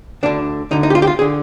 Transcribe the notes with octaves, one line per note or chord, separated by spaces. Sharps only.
D2 D3 D4
D2 D3 D#4
D#4
G4
F4
G4
F4
G#4
D3